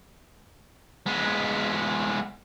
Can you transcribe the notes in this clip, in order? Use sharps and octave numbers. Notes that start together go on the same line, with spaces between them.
G#3 B3